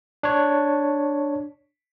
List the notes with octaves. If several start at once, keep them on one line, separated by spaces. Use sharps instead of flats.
D4 C#5